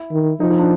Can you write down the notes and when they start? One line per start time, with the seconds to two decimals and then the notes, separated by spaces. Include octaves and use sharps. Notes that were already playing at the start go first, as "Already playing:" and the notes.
Already playing: E4
0.11 D#3
0.40 F3 D#4
0.50 D#4
0.59 D4